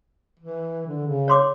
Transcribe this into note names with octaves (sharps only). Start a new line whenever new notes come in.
E3
D3
C#3
C#5 C6 D6